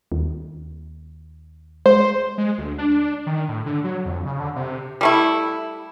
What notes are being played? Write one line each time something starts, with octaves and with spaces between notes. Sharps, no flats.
D#2
G#3 C5
G#3
D2
D4
D#3
A2
D3
F#3
F2
C#3
D3
C3
G3 A3 E4